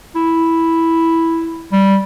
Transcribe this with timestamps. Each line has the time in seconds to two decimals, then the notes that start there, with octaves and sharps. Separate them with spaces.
0.15 E4
1.72 G3